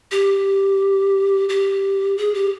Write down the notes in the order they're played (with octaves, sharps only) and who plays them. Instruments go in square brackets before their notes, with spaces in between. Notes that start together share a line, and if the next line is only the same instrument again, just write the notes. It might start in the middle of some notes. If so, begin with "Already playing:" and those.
[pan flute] G4
G4
G#4
G4